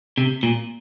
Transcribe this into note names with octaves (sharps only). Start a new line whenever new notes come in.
C3
A#2